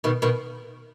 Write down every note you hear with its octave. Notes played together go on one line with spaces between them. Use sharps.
B2 D#3
B2 D#3